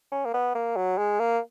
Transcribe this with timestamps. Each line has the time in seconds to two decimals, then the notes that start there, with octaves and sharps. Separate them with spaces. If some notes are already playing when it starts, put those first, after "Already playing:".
0.12 C#4
0.26 A#3
0.34 B3
0.55 A#3
0.77 F#3
0.98 G#3
1.20 A#3